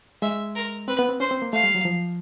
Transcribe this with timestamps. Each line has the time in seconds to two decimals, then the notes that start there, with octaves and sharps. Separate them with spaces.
0.22 G#3 E5
0.55 A#4
0.88 C4 B4
0.99 B3
1.09 C4
1.20 C#4 C5
1.31 C4
1.42 A#3
1.53 A3 F5
1.63 G3
1.75 F#3
1.85 F3